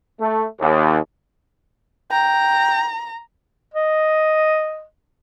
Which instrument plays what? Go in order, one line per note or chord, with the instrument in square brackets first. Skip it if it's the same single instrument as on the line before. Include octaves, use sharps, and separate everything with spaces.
[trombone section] A3
D#2
[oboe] G5 [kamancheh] A#5
[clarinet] D#5